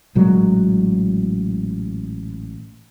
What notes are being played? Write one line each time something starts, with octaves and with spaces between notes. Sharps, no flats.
A1 A#2 F#3 G#3